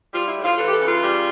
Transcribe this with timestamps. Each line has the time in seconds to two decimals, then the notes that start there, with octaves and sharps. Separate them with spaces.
0.13 G3 F4
0.28 E4
0.35 A2
0.43 F4
0.57 E3 A4
0.68 G4
0.72 A4
0.80 C#3
0.87 F4
1.02 G3